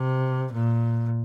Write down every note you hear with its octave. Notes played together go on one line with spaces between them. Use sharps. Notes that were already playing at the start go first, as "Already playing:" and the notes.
Already playing: C3
A#2